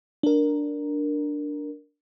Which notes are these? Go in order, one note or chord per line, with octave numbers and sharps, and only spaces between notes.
D4 A#4